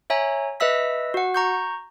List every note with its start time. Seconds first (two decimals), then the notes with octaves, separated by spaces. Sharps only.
0.10 C#5 E5 G#5 A#5
0.60 B4 D#5 E5 E6 B6
1.14 F#4 F#5
1.34 A#5 C#6 G6